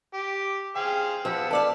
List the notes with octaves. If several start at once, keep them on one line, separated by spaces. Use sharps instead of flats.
G4
G#4 C5 F5 G5
F3 B3 E6
A4 D5 F5 A5